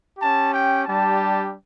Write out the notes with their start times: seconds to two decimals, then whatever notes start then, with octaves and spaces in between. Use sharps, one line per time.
0.17 C#4 G4 A5
0.51 G5
0.85 G3 D4 G4 A5